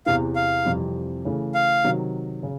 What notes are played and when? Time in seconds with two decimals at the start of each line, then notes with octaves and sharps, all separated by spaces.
0.06 E2 C3 E3 F5
0.36 F5
0.65 F2 C3 E3 G3
1.25 C#3 E3 A3
1.55 F5
1.84 C3 D#3 F#3
2.43 C#3